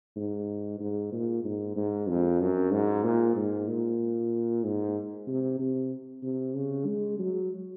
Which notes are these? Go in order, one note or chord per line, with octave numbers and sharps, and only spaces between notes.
G#2
G#2
A#2
G#2
G#2
F2
F#2
G#2
A#2
G#2
A#2
G#2
C3
C3
C3
C#3
G#3
F#3